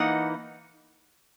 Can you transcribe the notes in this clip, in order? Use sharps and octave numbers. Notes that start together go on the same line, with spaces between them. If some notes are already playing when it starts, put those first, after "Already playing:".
Already playing: E3 A#3 D#4 D#5 F#5